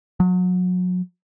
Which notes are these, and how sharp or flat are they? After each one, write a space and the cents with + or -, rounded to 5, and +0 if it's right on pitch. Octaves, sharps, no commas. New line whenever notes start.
F#3 -30